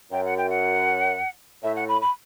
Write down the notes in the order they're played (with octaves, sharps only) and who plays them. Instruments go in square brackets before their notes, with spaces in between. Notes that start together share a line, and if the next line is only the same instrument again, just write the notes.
[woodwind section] F#2 [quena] G5
[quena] F#5
G5
F#5
[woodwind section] A2 [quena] E5
[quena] F#5
B5
B5